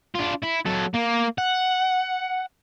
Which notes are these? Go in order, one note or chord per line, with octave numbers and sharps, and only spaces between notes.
D4 F4
E4
F#3 A4
A#3
F#5